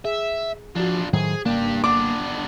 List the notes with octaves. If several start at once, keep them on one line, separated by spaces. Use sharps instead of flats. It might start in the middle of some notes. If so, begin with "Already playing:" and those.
G#4 E5
F3 D4 F4 F#4
A2 D#3 F#3 G#4 C5
G#1 C#3 A#3 D4 G4
B3 D4 D6